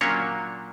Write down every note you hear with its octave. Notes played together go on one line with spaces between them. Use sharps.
A#2 F#3 A#3 C#4 D4 C#5